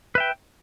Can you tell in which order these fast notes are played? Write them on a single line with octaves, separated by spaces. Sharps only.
B4 E5 G5